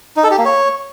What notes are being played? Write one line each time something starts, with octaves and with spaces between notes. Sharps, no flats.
D#4
A4
G4
A#3
C#5